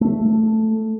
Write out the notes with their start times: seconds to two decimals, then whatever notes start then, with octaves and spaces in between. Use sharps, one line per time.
0.01 A3